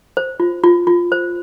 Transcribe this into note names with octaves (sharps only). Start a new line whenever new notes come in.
C5
F4
F4
F4
C5